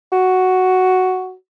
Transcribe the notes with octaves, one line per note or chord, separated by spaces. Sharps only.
F#4